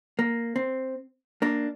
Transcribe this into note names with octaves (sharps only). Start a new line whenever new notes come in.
A#3
C4
A#3 D4